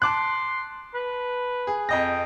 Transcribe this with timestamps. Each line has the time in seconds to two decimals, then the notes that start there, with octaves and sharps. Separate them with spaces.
0.02 A5 C6 D6 F#6
0.94 B4
1.67 G#4
1.89 F2 D#5 G5 A#6